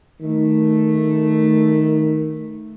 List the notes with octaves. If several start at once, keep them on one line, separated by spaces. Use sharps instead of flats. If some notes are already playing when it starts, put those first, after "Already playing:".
D#3 A3